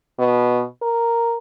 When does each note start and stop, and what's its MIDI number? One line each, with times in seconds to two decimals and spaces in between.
0.19 0.63 47
0.82 1.38 70